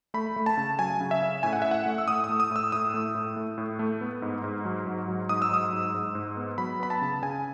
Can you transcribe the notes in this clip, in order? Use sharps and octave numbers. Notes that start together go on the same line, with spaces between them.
A3 B5
A3
A5
C#3
F#3 G#5
C#3
E5
C#4
A2 G#5
F#5
A2 E5
F#5
A3
E6
A2 D#6
D#6
A3
D#6
A2
E6
A2 D#6
A3
A2
A3
A2
A3
B3
G#2
G#2
F#3
G#2
F#3
G#2 D#6
E6
F#3 D#6
G#2
G#2
G#2
B3
F#3 B5
B3 B5
A5
C#3
C#3 G#5